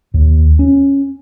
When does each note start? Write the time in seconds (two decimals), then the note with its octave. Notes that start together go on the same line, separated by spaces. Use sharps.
0.14 D#2
0.59 C#4